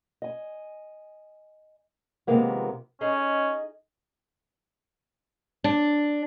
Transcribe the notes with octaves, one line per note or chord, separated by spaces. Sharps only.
D#5 G#5
C3 D#3 F3 G#3 A#3 B3
C#4 D#4 G#4 D#5
D4